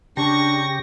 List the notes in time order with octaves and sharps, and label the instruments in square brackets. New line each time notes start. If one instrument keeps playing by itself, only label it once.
[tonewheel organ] C#3 G4 A#6 [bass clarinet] D4 [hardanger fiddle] C#6